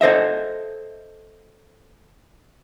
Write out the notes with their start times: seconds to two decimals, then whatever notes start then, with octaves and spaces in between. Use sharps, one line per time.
0.01 A4 C5 D#5 E5